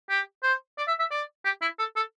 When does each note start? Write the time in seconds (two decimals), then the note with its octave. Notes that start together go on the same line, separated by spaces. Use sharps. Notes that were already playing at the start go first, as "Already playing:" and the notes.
0.10 G4
0.43 C5
0.78 D5
0.88 E5
0.99 E5
1.11 D5
1.45 G4
1.62 E4
1.79 A4
1.96 A4